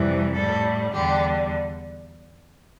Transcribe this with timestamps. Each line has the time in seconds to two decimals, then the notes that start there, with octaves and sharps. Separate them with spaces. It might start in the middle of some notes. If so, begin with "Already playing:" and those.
Already playing: F2 C3 E3 G3
0.35 A2 G3 A4
0.92 E2 D3 G3 G4